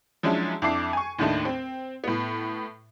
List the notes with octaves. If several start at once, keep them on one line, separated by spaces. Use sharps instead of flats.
F3 F#3 G#3 C#4 D4 E4
F2 D4 E4 D6 C7
G#5 C#6
D#2 A2 D#3 A3 D4 D#4
C4
A2 B3